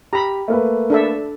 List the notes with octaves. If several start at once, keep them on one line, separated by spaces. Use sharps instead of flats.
G4 A#5 B5
A3 A#3 B4
D4 A4 E5